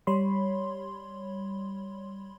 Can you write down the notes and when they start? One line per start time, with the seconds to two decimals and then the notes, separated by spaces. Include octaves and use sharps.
0.07 G3 C#5 B5 C6